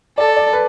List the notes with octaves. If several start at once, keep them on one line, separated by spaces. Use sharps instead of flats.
A4 D5
D5
B4